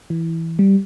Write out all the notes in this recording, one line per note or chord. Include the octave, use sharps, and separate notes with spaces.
E3
G3